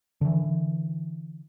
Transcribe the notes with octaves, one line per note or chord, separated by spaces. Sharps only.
D3 E3